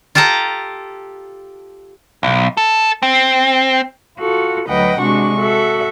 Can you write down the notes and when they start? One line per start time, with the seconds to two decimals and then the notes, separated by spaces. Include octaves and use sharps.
0.15 F4 G4 A4 A5 A#5
2.23 B1
2.57 A4
3.03 C4
4.18 F4 F#4 A4
4.68 D2 F#3 B4 D#5 F#5 G5
4.99 C3 G#3 D4 F#4 C#6
5.37 F#4 A4 E5